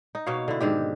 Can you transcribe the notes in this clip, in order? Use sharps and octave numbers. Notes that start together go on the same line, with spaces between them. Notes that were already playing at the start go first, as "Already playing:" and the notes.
D#4
B2 A#3 C#5 F5
D3 E4
G#2 D3 D#3 G4